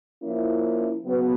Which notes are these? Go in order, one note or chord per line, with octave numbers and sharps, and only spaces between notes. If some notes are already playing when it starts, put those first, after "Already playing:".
F3 A#3 C#4 E4
C#3 F#3 B3